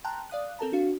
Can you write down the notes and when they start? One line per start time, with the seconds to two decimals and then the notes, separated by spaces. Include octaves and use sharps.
0.04 G5 A5 A#5 C6 F6 F#6
0.30 D5 F5 D#6 F#6
0.59 C4 A4 A#4 A5 A#5
0.72 D4 F#4 F5